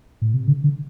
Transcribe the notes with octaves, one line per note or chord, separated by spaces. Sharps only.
A2
C3
D3
D3